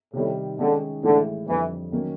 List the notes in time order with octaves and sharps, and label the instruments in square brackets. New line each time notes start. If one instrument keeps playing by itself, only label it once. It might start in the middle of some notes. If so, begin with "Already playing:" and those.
[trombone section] A2 [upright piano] C3 D#3 G3
[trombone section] D3 [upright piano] D#3 G#3 C#4
[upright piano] A2 E3 G#3 [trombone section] D3
[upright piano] F2 D3 G3 C4 [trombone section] E3
[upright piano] D#3 F#3 A#3 C#4